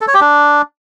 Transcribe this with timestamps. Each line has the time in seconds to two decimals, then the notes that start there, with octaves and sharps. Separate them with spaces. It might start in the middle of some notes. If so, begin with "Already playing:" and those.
0.01 A4
0.08 C#5
0.14 G4
0.21 D4